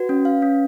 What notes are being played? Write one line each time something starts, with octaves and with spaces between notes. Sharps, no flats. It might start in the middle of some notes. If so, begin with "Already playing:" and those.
Already playing: F#4 B4
C#4
F5
C#4